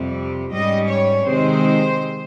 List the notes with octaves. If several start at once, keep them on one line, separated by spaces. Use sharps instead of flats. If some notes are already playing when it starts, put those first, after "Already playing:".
Already playing: F2 C3 G3
G#2 G3 C#4 D#5
C#5
C3 D#3 G#3 C4 D#4 C5